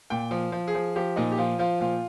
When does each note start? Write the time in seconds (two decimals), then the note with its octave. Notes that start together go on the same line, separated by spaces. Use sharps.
0.10 A#2 G5
0.31 F3
0.52 F3
0.68 G#4
0.75 F3
0.96 F3 G4
1.16 A#2 D#4
1.32 G4
1.38 F3 F4
1.59 F3 F4
1.80 A#2 F4